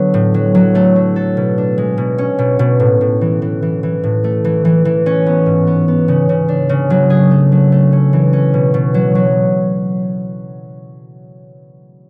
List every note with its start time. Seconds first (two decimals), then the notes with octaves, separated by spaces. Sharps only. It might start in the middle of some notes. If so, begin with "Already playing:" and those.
Already playing: D3 F#3 B3 D4
0.14 A2
0.34 F#3
0.55 F#3
0.75 A3
0.96 F#3
1.16 A4
1.37 B2
1.58 D4
1.78 G#3
1.98 B2
2.18 C#4
2.39 B2
2.59 B2
2.80 A2
3.01 A2
3.21 E3
3.42 E3
3.62 E3
3.83 E3
4.04 A2
4.24 A3
4.45 E3
4.65 E3
4.85 E3
5.06 C#4
5.27 B3
5.46 G#2
5.67 B3
5.88 B3
6.08 C#3
6.29 C#3
6.48 D4
6.69 C#3
6.90 F#3
7.10 G#4
7.31 A3
7.52 F#3
7.72 A3
7.92 C#4
8.13 E3
8.33 C#4
8.54 B2
8.74 B2
8.94 F#3
9.15 F#3